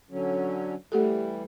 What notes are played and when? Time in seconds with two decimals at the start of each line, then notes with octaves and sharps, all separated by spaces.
0.11 D3 F#3 C#4
0.92 E3 G3 A3 G4 A4